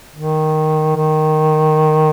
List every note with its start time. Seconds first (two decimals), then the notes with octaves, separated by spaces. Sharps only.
0.15 D#3
0.96 D#3